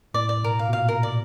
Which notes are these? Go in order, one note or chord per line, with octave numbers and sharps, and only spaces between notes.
A2 D5
D5
B2 A#4
F5
B2
A#2 F5
A#4
D5